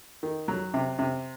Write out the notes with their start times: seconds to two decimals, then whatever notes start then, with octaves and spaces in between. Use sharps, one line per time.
0.23 D#3
0.48 F#3
0.74 C3
0.99 C3